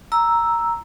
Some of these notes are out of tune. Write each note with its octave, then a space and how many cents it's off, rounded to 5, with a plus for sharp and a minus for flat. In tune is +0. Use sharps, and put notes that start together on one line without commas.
A#5 +0 E6 +0